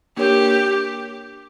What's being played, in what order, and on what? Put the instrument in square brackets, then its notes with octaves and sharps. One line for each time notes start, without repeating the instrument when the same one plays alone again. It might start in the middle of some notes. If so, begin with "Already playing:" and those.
[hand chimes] A#3 D4 A#4 C#5 [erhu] G4